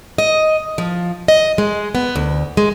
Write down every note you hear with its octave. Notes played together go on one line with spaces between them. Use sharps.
D#5
F3
D#5
G#3
B3
D2
G#3